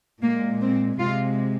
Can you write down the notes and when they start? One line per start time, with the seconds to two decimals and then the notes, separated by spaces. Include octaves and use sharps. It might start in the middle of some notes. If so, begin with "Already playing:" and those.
0.22 A#2 G#3 A#3
0.61 C4
0.98 C3 G#3 F4